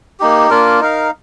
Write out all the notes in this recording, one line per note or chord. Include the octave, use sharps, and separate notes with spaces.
A#3 D#4 G4
A#3 D4 F4 A#4
D#4 A#4 F5